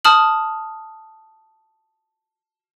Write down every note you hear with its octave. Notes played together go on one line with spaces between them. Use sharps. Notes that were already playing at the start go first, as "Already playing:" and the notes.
A5 D#6 F6 F#7